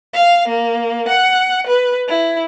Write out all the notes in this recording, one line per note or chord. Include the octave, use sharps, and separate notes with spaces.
F5
A#3
F#5
B4
E4